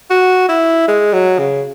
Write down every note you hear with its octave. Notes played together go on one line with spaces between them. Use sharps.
F#4
E4
G#3
F#3
C#3